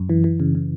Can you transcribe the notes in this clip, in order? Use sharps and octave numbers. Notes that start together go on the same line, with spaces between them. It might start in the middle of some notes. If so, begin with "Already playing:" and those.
Already playing: F#2
E3
E3
C#3
C#3